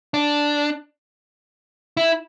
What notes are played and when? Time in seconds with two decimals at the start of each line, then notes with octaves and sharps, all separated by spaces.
0.14 D4
1.97 E4